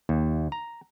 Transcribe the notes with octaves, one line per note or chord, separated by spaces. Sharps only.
D#2
A#5